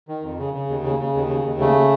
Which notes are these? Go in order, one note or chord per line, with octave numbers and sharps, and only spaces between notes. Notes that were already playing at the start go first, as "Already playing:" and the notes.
D#3
F2
C#3
C#3
D#2
C#3
C#3
D#2
C#3
D#2
C#3 A3